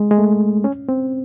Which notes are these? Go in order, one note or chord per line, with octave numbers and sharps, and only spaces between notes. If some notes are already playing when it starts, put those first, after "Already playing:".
Already playing: G#3
G#3
A3
C#4
C4